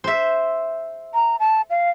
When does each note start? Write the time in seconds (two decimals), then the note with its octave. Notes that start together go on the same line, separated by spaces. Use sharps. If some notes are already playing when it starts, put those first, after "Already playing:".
0.04 C5 E5
1.14 A#5
1.40 A5
1.70 F5